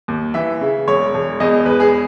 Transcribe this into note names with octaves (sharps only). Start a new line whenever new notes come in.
D#2
E3 E5
C#3
E1 C#5
E1
E2 D#5
E1 B4
G#4